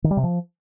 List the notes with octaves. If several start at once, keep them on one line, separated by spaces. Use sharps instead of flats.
D#3
G3
C3
F3